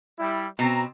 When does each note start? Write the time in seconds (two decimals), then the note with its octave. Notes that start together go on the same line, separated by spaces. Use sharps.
0.19 G3 E4
0.59 B2 C4 A#5